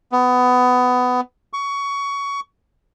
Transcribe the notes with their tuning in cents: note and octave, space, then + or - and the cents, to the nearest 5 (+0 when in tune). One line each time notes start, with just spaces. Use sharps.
B3 +20
C#6 +20